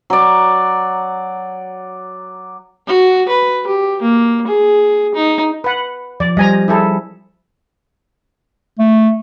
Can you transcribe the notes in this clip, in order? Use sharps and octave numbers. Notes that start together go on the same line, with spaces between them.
F#3 D5
F#4
B4
G4
A#3
G#4
D#4
B4 F#5
F3 D5
G3 C5 D#5 G#5 A#5
E4 G#4 A4
A3